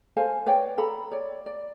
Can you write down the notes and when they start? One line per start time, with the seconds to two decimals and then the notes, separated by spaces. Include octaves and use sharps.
0.17 A4 C5 F5 G#5
0.46 B4 C#5 D5 G5
0.78 A4 A#5 B5
1.11 C#5 D5
1.46 D5